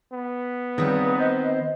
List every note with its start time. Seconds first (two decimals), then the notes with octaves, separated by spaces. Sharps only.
0.12 B3
0.78 C#2 D#3 G3 C4 B4 D#6
1.19 C5 D#5